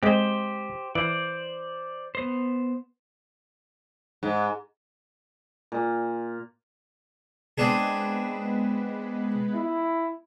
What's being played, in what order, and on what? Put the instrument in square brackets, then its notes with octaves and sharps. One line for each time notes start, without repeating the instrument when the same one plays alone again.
[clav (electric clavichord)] G#3 C4 [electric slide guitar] G4 C5
[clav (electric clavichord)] E3 [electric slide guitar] C5 D5
[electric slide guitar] B3 C5
[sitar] G#2
[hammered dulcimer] A#2
[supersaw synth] G#3 B3 B4 [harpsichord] C4 D4 G#4
[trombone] E4